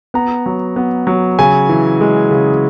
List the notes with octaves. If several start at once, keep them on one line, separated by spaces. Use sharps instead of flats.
B3 A#5
F#3
B3
F#3
C#3 G#5
E3
G#3
C#3